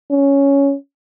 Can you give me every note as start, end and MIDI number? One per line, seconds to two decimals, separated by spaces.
0.11 0.74 61